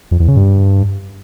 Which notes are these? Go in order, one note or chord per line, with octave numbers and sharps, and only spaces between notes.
F2
E2
C#3
G2